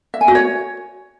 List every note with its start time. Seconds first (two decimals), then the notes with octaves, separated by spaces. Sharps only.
0.14 E5
0.21 G#5
0.28 F#4
0.35 C#5